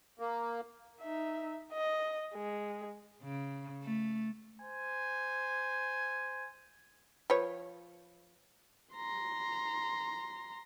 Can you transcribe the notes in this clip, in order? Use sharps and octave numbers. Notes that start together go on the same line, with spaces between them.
A#3
D#4 E5
D#5
G#3
C#3
A3
C5 G#5
F3 B4 C#5
A#5 C6